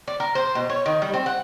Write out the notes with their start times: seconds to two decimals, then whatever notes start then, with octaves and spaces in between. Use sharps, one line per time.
0.08 D5
0.20 A#4
0.35 C5
0.55 B2
0.70 C#5
0.86 D#3
1.02 G3
1.14 C4
1.26 F#5